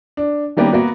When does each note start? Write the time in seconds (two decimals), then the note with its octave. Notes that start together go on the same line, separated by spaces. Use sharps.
0.17 D4
0.57 D#3 G3 A#3 B3 C#4 G4
0.72 A#3 B3 F#4